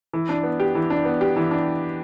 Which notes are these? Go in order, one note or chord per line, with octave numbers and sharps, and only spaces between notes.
E3
D4
B3
G4
E3
D4
B3
G4
E3
D4